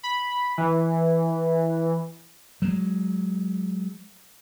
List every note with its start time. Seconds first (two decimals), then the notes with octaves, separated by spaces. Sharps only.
0.03 B5
0.58 E3
2.62 F#3 G#3